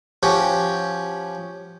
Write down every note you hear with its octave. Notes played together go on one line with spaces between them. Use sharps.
F3 C#4 F#4 G4